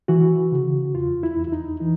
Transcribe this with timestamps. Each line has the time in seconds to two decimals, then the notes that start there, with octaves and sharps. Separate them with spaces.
0.08 E3 F#4
0.52 C#3
0.95 E2 F4
1.23 E4
1.37 E2
1.47 E4
1.52 D#4
1.80 E3 D#4